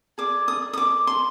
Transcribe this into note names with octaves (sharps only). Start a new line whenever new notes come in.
G#4 D5 D6
D#6
D#6
D6
C6